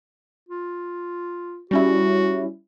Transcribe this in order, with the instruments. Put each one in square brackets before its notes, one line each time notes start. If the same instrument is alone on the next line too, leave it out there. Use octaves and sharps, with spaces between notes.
[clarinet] F4
[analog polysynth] G3 C#4 E4 [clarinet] F#4